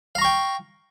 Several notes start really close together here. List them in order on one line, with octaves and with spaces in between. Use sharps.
F5 A#5 C#6 G5